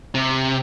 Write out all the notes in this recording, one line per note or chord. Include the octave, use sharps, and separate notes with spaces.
C3